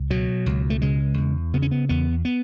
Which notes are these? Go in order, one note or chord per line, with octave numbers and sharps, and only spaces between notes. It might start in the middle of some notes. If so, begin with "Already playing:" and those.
Already playing: C#2
B2 F#3
C#2
A3
C#3 G#3
E2
C#3 B3
C#4
B3
E2 B3
B3